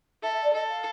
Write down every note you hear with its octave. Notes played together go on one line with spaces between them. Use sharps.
A4 E5
E5
D5
A4 D#5
F5